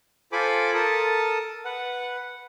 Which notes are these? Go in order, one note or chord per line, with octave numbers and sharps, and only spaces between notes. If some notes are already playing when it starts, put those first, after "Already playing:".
F4 A4 C5 G#5 B5 D6
A4 A#4 A5 D#6
B4 F#5